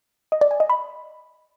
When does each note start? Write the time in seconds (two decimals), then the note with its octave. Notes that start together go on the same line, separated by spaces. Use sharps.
0.32 D#5
0.41 D5
0.51 G#5
0.60 D#5
0.70 B5